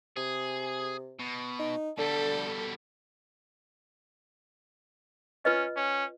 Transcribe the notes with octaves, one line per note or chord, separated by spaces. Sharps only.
C3 G#4
B2
D#4
B2 D3 G3 A4
C#4 F4 B4 D#5
C#4